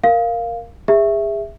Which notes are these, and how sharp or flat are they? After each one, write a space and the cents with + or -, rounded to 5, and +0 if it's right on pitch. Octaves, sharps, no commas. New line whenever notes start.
A#4 +0 F5 +0
G#4 -30 E5 +0